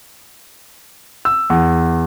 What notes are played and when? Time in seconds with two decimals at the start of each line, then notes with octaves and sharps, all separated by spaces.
1.25 E6
1.50 E2